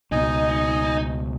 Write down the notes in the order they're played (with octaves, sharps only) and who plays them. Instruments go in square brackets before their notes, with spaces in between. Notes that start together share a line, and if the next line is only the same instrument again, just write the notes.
[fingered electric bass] C#2 B2 [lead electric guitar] D#4 [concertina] D#5 G#5